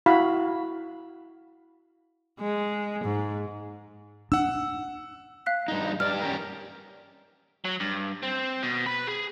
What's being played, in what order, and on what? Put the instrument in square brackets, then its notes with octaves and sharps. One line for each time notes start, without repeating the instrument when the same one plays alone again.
[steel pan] E4 F#4 F5 B5
[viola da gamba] G#3
G#2
[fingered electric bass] D4 [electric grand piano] F#5 E6
[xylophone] F5 F#6 B6
[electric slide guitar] G2 D#4
[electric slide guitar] G2 D5 [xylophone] F6
[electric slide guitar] C#4 G4 A#4
[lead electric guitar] F#3
G2
C4
B2
B4 B5
G#4